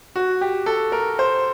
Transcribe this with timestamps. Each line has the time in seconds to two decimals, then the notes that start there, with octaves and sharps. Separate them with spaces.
0.16 F#4
0.41 G4
0.66 A4
0.92 A#4
1.19 C5